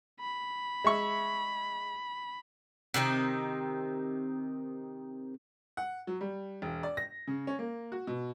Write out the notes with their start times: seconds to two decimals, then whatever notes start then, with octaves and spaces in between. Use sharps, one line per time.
0.21 B5
0.84 G#3 E5 C#6
2.94 C3 D#3 C4 D#4
5.77 F#5
6.07 F#3
6.21 G3
6.62 E1
6.83 D5
6.97 A#6
7.27 C#3
7.47 C#4
7.59 A#3
7.92 F#4
8.07 B2